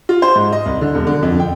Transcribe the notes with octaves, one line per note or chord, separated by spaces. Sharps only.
F4
C5
G#2
D#5
C2
D3
E1
D3
F2
G5